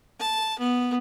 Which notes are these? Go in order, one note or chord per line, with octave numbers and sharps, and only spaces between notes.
A5
B3